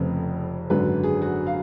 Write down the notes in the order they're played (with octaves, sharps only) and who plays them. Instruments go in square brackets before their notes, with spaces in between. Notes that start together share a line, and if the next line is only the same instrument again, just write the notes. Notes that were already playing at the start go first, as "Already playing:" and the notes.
Already playing: [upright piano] F1 F2 C#3 B4
G#1 F#2 D3 B4
G#4
F#4
F5